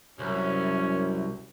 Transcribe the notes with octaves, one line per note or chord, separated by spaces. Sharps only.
C2 F#2 C#4